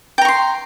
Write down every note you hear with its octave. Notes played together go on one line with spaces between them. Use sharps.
G5 A#5 C6 C#6